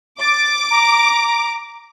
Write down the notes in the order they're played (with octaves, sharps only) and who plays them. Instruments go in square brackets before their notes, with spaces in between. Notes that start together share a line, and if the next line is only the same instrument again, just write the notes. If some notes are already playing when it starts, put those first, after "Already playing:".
[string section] D6 [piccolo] A6
[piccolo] A#5